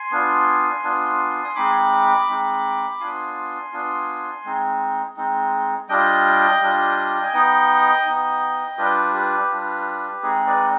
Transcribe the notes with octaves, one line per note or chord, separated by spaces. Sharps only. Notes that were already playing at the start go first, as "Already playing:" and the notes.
Already playing: G#5 C6
B3 D4 F4
B3 D4 F4
D#6
G#3 C4 D#4 B5 D6
G#3 C4 D#4
B3 D4 F4 G#5 C6
B3 D4 F4
G#3 C4 D#4
G#3 C4 D#4
G3 D4 F4 D#5 G5
G3 D4 F4
G#5
B3 D#4 D#5 G5
B3 D#4
G3 D4 F4 G4 B4
G4 B4
G3 D4 F4
G#3 C4 D#4 G#4
B4 D5